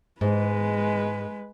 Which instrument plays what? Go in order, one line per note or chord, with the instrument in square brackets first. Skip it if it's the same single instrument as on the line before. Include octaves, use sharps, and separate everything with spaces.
[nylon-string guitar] G#2 [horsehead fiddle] G#3 B4